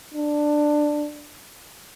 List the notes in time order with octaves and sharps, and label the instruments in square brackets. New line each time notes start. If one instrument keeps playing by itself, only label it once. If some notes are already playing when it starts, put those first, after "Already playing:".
[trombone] D4